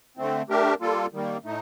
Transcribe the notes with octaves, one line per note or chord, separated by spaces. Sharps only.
D3 A3 C4
A3 D4 G4 A#4
G3 A#3 F4 A4
D#3 G3 A#3
A2 A3 D#4